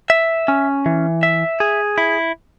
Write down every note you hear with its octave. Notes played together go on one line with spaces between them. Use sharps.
E5
C#4
E3
E5
G#4
E4